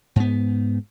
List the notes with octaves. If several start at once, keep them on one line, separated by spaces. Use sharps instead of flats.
G#2 B3